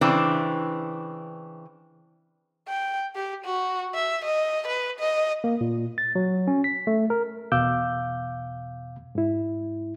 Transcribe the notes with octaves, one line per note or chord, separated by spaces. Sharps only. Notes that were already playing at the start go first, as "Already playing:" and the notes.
C#3 E3 C4 D4
G5
G4
F#4
E5
D#5
B4
D#5
A#3
A#2
A6
F#3
C#4
B6
A3
A#4
E2 B2 F5 D6 E6 G6
G#2 E4